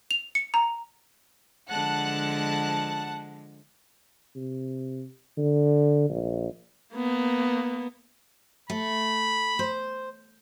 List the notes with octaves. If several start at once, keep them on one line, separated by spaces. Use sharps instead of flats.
F7
C#7
A#5
D3 F3 G#3 F#5 A5 F#6
C3
D3
A#1
A#3 B3
A3 B5
C5